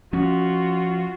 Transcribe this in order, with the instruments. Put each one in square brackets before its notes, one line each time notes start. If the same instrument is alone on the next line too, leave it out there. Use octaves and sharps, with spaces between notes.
[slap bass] F3 C#4 [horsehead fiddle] F4 F#4